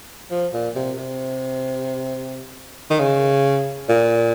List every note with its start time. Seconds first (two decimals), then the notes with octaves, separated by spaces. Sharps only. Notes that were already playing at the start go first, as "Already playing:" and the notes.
0.31 F3
0.54 A#2
0.75 C3
0.98 C3
2.91 D#3
3.00 C#3
3.89 A#2